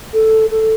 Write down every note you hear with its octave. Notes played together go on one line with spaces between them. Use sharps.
A4
A4